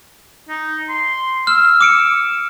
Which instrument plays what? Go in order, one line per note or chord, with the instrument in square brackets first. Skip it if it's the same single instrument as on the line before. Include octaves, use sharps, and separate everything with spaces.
[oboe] D#4
C6
[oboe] E6 [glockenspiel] F6
[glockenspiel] D6 C#7 D7